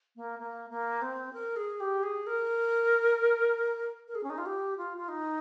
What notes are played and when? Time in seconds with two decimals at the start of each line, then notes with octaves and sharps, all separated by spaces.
0.16 A#3
0.39 A#3
0.70 A#3
1.02 C4
1.33 A#4
1.56 G#4
1.80 G4
2.03 G#4
2.27 A#4
4.08 A#4
4.15 G#4
4.23 C#4
4.30 D#4
4.38 F4
4.46 G4
4.77 F4
4.97 F4
5.08 D#4